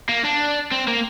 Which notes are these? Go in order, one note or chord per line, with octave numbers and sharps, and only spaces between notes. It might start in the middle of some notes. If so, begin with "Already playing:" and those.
A#3
D4
C4
A#3